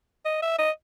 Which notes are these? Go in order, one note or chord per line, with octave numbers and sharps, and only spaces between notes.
D#5
E5
D#5